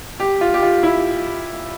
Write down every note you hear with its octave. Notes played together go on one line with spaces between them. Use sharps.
G4
F4
G4
F4
E4